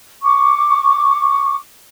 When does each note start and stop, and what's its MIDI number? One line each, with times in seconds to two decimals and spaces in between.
0.24 1.55 85
0.24 1.55 86